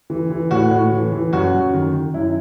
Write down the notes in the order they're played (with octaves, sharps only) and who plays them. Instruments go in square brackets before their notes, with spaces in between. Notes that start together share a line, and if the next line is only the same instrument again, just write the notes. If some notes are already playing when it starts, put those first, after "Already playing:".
[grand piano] E3
E3
A2 F#4
A2
E3
E3
F#2 F#4
F#2
D#3
D#3
F#2 E4